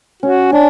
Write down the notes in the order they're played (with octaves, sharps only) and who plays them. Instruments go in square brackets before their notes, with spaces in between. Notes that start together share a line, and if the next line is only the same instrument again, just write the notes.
[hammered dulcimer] C#4 [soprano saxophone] F#4
[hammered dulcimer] C#4 [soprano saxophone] D4